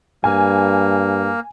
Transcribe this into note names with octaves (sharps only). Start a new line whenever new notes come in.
G2 A#3 G#5